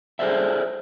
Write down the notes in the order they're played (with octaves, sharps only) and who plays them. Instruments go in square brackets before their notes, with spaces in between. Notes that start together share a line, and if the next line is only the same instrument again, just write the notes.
[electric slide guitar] G#4 A4 C5 D5 E5